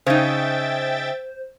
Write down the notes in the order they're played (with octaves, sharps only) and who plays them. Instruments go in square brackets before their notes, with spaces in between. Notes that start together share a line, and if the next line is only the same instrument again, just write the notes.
[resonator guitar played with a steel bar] C#3 D#4 [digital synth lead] C5 [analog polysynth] E5 G5 A6